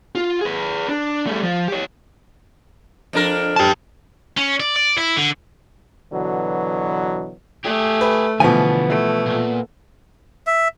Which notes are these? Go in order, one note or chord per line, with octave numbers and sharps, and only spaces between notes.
F4
G#4 B4
D4
G3 A3
F3
G4 C#5
F2 D4 A#4
G4 A5
C#4
D5
D5
E4
D3
B2 D3 E3 F#3
A3 G4 G#4
B4
D2 B2 E3 F3 B3 G#5
A3
A#2
E5